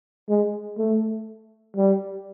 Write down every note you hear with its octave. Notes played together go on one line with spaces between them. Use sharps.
G#3
A3
G3